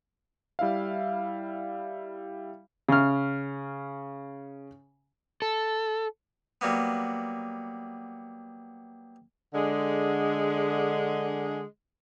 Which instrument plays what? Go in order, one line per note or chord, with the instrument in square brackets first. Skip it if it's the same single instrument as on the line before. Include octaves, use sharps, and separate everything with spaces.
[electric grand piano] G3 E4 E5 F5
[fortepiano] C#3 F6
[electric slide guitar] A4
[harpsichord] F#3 G3 A#3 B3
[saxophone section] D3 G#3